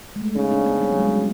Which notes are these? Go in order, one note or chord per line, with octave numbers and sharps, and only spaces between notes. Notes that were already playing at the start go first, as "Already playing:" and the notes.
G#3
A3
C#3 C#4 D#4
C4 D4
B3 C#4
G3
F#3
G#3
G3
G#3